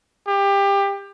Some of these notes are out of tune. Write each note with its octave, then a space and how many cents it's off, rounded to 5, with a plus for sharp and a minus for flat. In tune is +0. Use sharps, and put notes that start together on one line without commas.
G4 +20